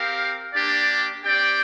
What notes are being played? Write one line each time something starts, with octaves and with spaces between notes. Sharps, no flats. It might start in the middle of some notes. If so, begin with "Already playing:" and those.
Already playing: C4 G4 A#4 F5
A#3 D4 G4 D5
C4 G4 D5 G5